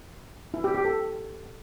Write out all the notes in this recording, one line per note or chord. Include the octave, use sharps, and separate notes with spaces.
E4
G4
G4
A4